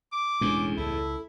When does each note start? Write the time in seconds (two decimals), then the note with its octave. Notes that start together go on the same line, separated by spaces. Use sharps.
0.12 D6
0.41 E1 E2 A2 G#3 C#4 D4
0.77 C#2 E4 A4